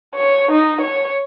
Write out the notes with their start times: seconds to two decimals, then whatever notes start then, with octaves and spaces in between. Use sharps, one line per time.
0.15 C#5
0.51 D#4
0.81 C#5